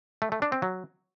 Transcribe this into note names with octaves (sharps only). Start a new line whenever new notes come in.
A3
A3
D4
C4
F#3